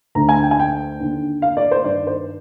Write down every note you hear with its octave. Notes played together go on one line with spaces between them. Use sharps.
D2 D3 A#5
G#5
G5
G#5
G5
D#2 D3
F5
D5
C5
G2 D#3 D5
C5